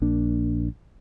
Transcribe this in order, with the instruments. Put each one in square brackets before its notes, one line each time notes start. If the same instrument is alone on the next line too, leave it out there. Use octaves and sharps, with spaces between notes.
[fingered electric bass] A#1 A#3 D4